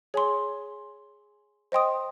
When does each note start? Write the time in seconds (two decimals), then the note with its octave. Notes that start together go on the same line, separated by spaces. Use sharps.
0.14 G#4 C#5 G#5 C6
1.72 C5 D#5 G5 C6 D#6